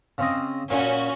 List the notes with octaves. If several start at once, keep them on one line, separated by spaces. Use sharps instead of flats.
C#3 C4 D#5
A#2 C#4 F#4